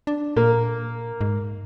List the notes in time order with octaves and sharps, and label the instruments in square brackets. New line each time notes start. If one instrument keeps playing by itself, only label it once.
[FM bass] D4
[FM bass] A#2 [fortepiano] A#3
[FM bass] G#2